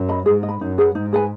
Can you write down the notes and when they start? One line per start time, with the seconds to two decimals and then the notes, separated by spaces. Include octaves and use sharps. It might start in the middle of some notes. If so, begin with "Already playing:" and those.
Already playing: F#2
0.09 D#5 B5
0.26 G#2 G#4
0.43 D#5
0.49 B5
0.61 F#2 D#4
0.78 G#4 B4 F#5
0.95 G#2 D#4
1.13 G#4 B4 G#5